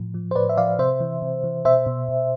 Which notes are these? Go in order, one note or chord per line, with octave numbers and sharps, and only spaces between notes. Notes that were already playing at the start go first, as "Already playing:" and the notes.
Already playing: A2 F3
F3
C5
A2 B4 D5
E5
F3 D5 F5
C3 C5 E5
E3
C3
E3
B2 C5 E5
B2
B2